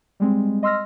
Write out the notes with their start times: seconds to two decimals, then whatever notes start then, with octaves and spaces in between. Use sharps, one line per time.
0.20 G3 G#3 C4
0.63 D#5 C6 E6 F6 A#6